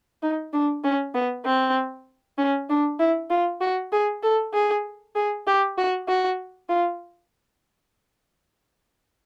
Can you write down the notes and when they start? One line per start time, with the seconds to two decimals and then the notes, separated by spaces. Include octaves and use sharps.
0.23 D#4
0.53 D4
0.84 C#4
1.14 B3
1.45 C4
2.38 C#4
2.69 D4
2.99 E4
3.30 F4
3.61 F#4
3.92 G#4
4.23 A4
4.53 G#4
5.15 G#4
5.47 G4
5.78 F#4
6.08 F#4
6.69 F4